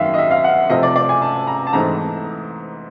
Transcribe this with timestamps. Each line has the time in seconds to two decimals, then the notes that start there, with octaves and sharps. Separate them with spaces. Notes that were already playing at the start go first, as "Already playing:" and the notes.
Already playing: F#2 D#3 F#3 A#3 E5 F5
0.14 D#5
0.18 E5
0.31 F5
0.44 F#5
0.70 C3 F3 A3 C4 D#5
0.83 D5
0.96 D5
1.09 G#5
1.22 A5
1.47 A#5
1.67 A5
1.73 G#2 E3 A3 C4 D#4 A#5